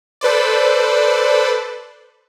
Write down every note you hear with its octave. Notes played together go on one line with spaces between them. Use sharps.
A4 B4 C5 D5